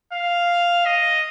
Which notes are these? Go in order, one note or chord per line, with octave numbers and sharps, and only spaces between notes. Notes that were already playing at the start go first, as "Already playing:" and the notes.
F5
D#5